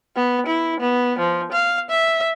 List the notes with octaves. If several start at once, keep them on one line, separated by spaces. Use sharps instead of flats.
B3
E4
B3
F3
F5
E5